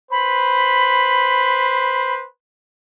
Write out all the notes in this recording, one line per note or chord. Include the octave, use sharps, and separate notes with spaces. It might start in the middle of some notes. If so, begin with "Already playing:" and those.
B4 C5 B5